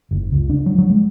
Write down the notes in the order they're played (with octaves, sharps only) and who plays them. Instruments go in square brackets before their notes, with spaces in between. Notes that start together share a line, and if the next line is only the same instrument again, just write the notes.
[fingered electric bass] F#1
C#2
D4
F#3
F#3
G#3